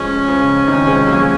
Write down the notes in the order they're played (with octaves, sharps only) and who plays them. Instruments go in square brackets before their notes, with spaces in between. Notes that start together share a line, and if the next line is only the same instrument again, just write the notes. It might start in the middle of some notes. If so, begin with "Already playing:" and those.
Already playing: [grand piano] F3 G#3 [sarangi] C#4
[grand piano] C#3 F3
C3 D#3
F3 G#3
F#3 A#3
G#3